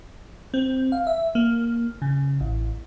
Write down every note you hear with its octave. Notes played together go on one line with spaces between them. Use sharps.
C4
F5
E5
A#3
C#3
A1